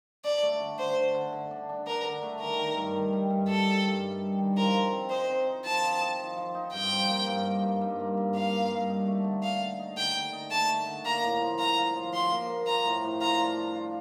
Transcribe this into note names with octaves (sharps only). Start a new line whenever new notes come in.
D4 D5
A3
D3
D3 C5
D3
D3
D3
D4
D4
D4 A#4
D3
A3
D#3 A#4
D#3
G2
D#3
G3
G2
G3 A4
G3
G2
G2
G3
D#3
F3 A#4
F3
C4
D#4 C5
C4
D#4
F3 A5
F3
D#4
F3
F3
D#4
G2 G5
F3
A#3
G2
A#3
G2
G2
A#3
G2
A#3 F5
G2
G2
D#4
A3
D3
D#4 F5
D3
D#4
D3 G5
D3
D#4
A3 A5
A3
D3
A#3 A#5
A2
F3
F4 A#5
F4
F3
F3 C6
A#3
A#3
F4 A#5
A2
A2
F4 A#5
D4
D4
F4